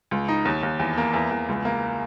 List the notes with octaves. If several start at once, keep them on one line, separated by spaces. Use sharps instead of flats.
C#2
D#4
D#2
D#2
E2
A#3
E2
E2
C#2
A#3